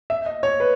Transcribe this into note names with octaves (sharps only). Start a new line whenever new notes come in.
E5
D#5
C#5
B4